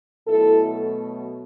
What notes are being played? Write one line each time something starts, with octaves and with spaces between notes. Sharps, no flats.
B2 F#3 A3 E4 A4